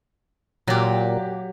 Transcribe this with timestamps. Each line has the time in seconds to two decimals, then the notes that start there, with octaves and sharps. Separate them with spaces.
0.67 A#2 F#3 G4